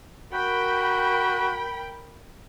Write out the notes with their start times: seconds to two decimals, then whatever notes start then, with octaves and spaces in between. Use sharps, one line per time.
0.33 F#4 A#4 G5 B5